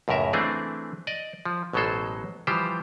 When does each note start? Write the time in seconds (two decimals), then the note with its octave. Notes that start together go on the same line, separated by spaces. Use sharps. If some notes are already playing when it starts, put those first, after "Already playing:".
0.08 C#2 F#2 A2 A#4 E5
0.33 E3 A3 C4 D4 G#4
1.07 D5 D#5
1.45 F3
1.73 A1 B2 F#3 G#3 A4 C5
2.47 E3 F3 G3 G4 C5